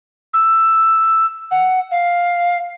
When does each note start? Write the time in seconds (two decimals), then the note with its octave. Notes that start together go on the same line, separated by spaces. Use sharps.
0.34 E6
1.51 F#5
1.91 F5